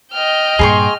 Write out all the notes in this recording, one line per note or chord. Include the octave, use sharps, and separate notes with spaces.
D#5 G5 F6
G2 A#2 G#4 C6 C#6